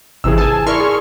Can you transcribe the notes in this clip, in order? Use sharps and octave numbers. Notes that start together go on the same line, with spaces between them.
G#1 C3 E3 G#4 E6
G#5 A5
E4 A#4 D5 C6 C#6 F6
G#4